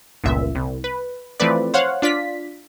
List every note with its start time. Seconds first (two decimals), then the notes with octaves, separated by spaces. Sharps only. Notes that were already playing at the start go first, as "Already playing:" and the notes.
0.24 G1 C#2 A#2 E5
0.55 C2
0.84 B4
1.40 E3 F3 A3 C4 B4 D5
1.74 C5 C#5 F5 F#5
2.02 D4 F4 D5 B6